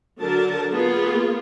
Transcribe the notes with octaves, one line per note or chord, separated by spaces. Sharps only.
D3 F#3 A#4 A5
A#3 B3 F4 G#4